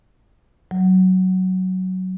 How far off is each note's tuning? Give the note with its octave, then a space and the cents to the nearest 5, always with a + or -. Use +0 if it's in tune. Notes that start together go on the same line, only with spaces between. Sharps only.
F#3 +10